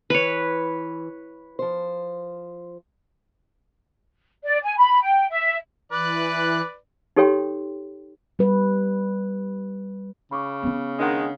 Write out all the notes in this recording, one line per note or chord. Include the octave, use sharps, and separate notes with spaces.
E3 B4 C#5
F3 C5
D5
G#5
B5
G5
E5
E3 B4 D5 F#6
D#4 G4 A4 C#5 G5 C6
G3 B4
C#3 B5 C#6 D6
B3 C#4
D#3 G#3 D4 F#5